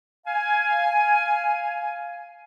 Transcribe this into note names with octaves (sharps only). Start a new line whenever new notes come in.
F5 G#5